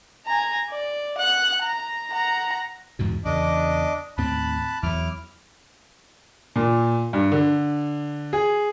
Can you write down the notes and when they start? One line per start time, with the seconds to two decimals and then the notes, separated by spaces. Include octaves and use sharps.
0.26 G#5 A#5
0.71 D5
1.18 F#5 F#6
1.63 A#5
2.11 F#5 A#5
2.99 E2 G#2 B2
3.25 E2 C#3 E3 D4 D#5 D6
4.18 D#2 A2 C4 A5 B5 F#6
4.83 E2 F#3 E4 D6 F6
6.56 A#2
7.13 G2
7.32 D3
8.33 G#4